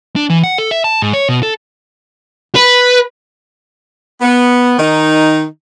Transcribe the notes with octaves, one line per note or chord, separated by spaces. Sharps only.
D4
E3
F#5
A4
E5
A5
G#2
C#5
B2
A4
B4
B3
D#3 D#4